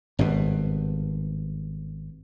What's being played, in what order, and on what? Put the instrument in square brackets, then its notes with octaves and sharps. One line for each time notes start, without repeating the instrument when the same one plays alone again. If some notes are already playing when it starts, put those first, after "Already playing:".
[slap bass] G#1 G2 B2